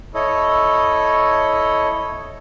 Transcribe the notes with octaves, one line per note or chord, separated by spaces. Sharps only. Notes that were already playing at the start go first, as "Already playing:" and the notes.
E4 A4 C#5 D#5